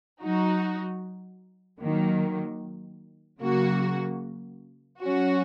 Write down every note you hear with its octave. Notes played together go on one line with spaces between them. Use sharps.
F#3 D#4 F#4
D#3 F#3 A#3
C#3 F#3 A#3 F#4
F#3 C#4 F#4